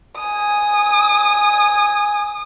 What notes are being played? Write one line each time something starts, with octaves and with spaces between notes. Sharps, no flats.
G#5 D#6